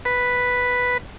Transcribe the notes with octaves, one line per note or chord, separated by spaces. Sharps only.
B4